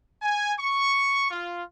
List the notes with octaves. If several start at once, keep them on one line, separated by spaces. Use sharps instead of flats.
G#5
C#6
F4